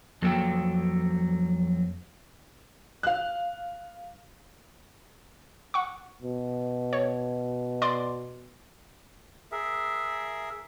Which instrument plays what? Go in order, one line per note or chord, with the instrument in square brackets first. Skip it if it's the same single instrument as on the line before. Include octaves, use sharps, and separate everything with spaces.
[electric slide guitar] F2 F#3 A#3 A4 G5
[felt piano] F5 F#6
[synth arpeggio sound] F#5 C#6
[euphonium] B2
[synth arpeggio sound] C#5
D5 C6 D6
[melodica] G#4 A#4 E5